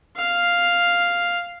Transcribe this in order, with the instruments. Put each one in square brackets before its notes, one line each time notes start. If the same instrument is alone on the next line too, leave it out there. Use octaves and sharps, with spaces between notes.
[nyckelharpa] F5